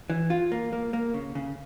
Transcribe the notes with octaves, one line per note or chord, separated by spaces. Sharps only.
E3
F4
A#3
A#3
A#3
C#3
C#3